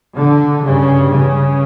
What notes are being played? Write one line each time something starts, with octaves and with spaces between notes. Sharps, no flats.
D3
G2 C#3
C#3